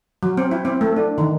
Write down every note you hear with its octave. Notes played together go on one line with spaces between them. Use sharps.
F#3
C4
E4
C4
A3
D4
D#3